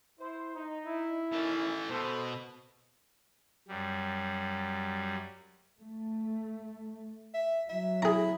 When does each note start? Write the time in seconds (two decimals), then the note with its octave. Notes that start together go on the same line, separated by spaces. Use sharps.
0.19 E4 C5
0.54 D#4
0.86 E4
1.32 B2 D#3 E3 C#4 A4
1.90 B2 A4 C5
3.68 F#2 G3
5.80 A3
7.34 E5
7.69 F#3 E5
8.02 E4 G#4 A#5